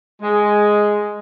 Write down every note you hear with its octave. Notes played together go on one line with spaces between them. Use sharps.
G#3